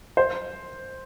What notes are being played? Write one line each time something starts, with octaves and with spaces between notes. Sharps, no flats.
C5